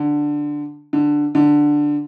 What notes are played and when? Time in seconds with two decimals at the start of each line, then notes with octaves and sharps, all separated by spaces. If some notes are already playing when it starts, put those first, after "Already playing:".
Already playing: D3
0.93 D3
1.35 D3